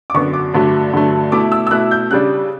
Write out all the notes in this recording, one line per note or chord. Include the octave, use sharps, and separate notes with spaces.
D6
F#2 D3 F#3 B3 C#6
D6
G2 D3 F#3 A3
G2 D3 F#3 A3
B2 A3 E4 D6
E6
E6
B2 A3 E4 F#6
G6
C#3 G3 D4 F#6